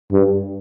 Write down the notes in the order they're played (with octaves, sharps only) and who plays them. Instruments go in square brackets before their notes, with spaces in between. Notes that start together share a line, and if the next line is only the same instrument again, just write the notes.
[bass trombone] G2